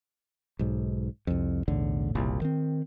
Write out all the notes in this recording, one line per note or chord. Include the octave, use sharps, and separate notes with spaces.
B1 G#2
C2 F2
B1 E2 A2 D3
F#1 C2 A#2
D#3 C4